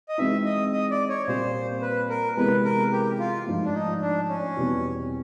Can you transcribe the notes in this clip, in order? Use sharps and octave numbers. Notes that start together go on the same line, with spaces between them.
D#5
E3 G#3 C4 D#4 E5
D#5
D#5
D5
C#5
A#2 G3 C4 C5
B4
A#4
C3 E3 G#3 B3 B4
A#4
G4
F4
G#2 F3 A3
D4
D#4
D4
C#4
E2 B2 G3 C4